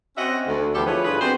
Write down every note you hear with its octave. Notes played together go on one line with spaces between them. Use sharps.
C4 C#4 F#4 D#5 E5 F#5
D2
E3 F3 B3 G4 A4
F3 E4 F4 G#4 B4 C#5
G2 D3 F4 G#4 B4
B3 C4 D4 F#4 C5